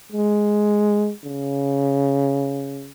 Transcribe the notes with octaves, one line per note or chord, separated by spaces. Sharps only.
G#3
C#3